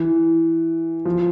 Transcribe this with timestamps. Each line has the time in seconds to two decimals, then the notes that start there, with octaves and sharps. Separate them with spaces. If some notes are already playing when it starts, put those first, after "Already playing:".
Already playing: E3
1.05 F3